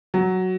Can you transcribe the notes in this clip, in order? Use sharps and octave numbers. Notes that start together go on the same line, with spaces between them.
F#3